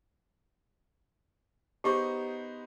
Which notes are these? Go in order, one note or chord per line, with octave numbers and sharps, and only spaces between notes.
B3 D#4 G4 G#4 C5 C#6